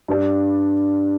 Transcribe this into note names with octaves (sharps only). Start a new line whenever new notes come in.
G2 G3 D4